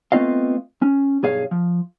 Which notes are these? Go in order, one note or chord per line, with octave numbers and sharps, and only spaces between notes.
A3 B3 C4 F4 D#5 F5
C#4
B1 G2 G#4 C#5 F5
F3